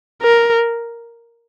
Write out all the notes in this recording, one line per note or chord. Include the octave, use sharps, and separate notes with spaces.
A#4